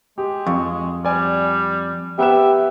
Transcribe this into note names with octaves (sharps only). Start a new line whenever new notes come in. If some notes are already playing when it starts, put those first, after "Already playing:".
G#3 G4
F2 C#6
G3 D5 G#5
B3 G4 B4 E5 E7